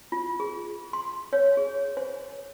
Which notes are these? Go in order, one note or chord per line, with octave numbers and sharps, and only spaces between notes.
F4
G#4
C6
C#5
G#4
C5